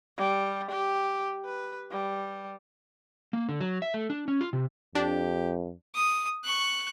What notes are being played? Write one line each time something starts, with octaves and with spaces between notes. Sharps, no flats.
G3
G4
B4
G3
A#3
D3
F#3
E5
A3
D4
C#4
F4
C3
F2 D4 G4
D#6
C#6 F#6